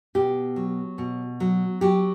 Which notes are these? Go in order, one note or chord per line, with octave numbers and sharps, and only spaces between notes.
B2 G4
F#3
B2
F#3
F#3 G4